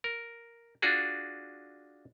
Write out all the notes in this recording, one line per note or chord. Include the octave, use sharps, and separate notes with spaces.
A#4
D4 F4 F#4 G#4